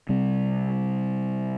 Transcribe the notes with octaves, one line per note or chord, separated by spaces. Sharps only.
C3 G3 C4